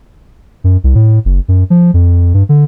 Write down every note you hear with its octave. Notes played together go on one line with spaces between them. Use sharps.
F#2
C2
A2
F#1
F#2
F3
F2
G2
D3